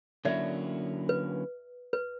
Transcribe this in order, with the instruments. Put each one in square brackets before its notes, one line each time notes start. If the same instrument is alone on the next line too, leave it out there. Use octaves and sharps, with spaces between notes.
[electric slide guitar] D3 F#3 A#3 C#4 E4 [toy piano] D5 E5
[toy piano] B4
B4